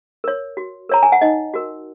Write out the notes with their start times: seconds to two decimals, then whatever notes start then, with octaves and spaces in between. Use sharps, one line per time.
0.24 A#4 C#5
0.57 F#4
0.89 A#4 C#5 A#5
1.03 G#5
1.12 F#5
1.21 D#4 D#5
1.54 F#4 A#4